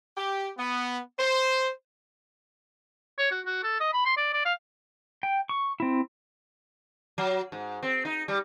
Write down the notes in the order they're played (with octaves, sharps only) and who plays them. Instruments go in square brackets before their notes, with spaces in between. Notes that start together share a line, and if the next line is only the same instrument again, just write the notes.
[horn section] G4
B3
C5
[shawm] C#5
F#4
F#4
A4
D#5
B5
C6
D5
D5
F5
[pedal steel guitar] G5
C#6
C4 E4
[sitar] F#3
G#2
C4
D#4
G3